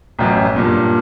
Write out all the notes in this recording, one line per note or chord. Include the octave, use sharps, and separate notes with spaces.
A1 F#2
G2 A#2